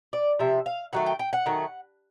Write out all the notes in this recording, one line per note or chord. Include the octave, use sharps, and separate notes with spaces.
D5
C3 F3 E5
F5
D#3 F#3 A3 F#5
G5
G5
F#5
D#3 F#3 A3